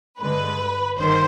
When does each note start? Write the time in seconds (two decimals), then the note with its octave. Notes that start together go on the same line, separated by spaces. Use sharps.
0.20 G2 D3 G#3 B4
0.97 G1 G2 D#3 C5